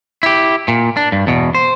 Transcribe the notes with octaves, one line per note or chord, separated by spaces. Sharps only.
E4 G4
A#2
D4
G2
E2 B2
C5